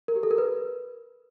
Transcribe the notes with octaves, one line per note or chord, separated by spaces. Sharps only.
A#4
G4
A4
A#4
B4